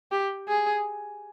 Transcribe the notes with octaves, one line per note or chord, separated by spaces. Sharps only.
G4
G#4